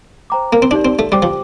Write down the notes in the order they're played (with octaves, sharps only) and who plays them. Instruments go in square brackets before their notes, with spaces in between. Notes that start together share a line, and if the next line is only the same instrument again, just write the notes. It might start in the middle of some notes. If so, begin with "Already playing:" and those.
[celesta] C5 G5 A#5 D6
[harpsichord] A#3
C4
[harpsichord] D4 [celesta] D#4 G4 D5
[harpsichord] C4
A3
[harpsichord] G3 [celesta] G4 C5 G5 D6
[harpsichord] F3